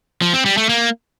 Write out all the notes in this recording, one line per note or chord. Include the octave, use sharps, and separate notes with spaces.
F3
C4
G3
A3
A#3